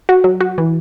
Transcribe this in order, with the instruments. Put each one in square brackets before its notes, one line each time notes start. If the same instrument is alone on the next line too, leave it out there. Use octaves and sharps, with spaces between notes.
[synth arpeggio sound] F#4
F#3
F#4
E3